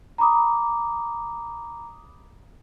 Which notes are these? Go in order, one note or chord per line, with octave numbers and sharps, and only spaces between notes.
A#5 B5 D6 D#6